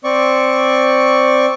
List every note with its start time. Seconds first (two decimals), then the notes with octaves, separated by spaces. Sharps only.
0.04 C4 D5 C#6